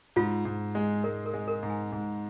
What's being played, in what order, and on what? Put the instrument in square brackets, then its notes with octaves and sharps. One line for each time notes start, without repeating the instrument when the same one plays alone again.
[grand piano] G#2 [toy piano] F4
[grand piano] G#2
G#3
[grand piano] G#3 [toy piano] A#4
[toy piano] A#4
[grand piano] G#3
[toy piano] A#4
[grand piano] G#2
[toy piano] G#5
[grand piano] G#2